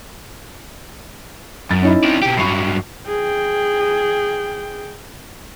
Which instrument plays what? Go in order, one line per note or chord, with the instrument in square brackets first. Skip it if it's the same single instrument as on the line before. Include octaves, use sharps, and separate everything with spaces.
[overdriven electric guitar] F#2 [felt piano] A6
[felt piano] C#4 D#4 E4
[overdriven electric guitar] C4 D5
B2 G4
[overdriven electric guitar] G2 F#3 [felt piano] B5 C#6 C7
[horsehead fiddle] G#4 G5